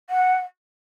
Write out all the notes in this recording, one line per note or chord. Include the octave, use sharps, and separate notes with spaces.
F#5